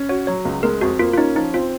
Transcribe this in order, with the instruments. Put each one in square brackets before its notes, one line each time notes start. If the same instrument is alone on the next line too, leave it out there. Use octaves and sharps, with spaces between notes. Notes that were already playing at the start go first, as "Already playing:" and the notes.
Already playing: [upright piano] C#4
[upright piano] F#4 [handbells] C#5
[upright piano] F#3 [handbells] C#5
[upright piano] C#2
[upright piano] G#3 [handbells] A#4
[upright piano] F2 [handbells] F#4
[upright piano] A#3 [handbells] F4
[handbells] F4
[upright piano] C#4 [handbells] D#4
[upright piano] F3 [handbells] D#4
[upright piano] C4 [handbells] F4